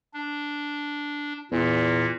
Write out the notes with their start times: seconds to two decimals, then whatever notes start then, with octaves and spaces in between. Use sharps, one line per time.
0.14 D4
1.51 E2 A#2